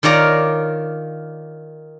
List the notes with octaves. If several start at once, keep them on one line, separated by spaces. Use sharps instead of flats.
D#3 F4 C#5 D5 A#5